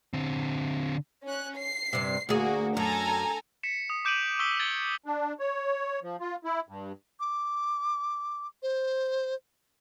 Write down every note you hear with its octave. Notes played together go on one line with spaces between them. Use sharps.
D3 C4
C#4 F#6
C7
G2 C3
D2 A#3 F#4 G#4
F#2 A4 G#5 A#5
B6 C#7 E7
D#6 C#7
D6 G6 D7 D#7 F#7
C#6 D#6 E6 B6 G7
G#6 A6 C#7 D7 G7
D4
C#5
F3
F4
E4
G2
D6
C5